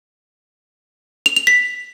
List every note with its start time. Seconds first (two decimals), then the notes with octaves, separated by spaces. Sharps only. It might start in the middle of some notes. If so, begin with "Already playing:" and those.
1.26 F7
1.36 F7
1.47 B6